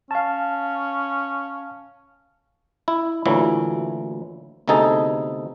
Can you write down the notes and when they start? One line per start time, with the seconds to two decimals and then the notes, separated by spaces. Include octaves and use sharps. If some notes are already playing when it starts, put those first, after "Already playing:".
0.11 C#4 F5 A5
2.88 E4
3.26 D2 A#2 E3 F#3 E4
4.68 D2 C3 B3 D#4 G#4 A4